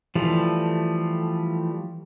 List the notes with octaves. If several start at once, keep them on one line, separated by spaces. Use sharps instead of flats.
E3 F3 G3 A3